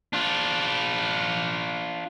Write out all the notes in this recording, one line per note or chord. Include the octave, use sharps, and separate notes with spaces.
D4 F4